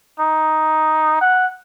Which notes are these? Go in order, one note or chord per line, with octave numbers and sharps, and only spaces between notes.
D#4
F#5